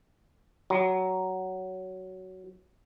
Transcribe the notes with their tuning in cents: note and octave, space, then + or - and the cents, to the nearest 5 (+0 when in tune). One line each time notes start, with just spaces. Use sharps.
F#3 +10